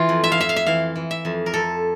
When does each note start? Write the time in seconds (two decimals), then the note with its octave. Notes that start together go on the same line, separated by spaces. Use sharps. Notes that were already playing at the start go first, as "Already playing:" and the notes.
Already playing: E3 F4
0.09 F2
0.24 E5
0.32 F5
0.38 F2 E5
0.49 F5
0.56 E5
0.66 E3 F5
0.96 E3
1.11 E5
1.25 F2
1.46 A#4
1.54 F2 A4